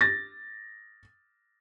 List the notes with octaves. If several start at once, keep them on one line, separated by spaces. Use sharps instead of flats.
A6 A#6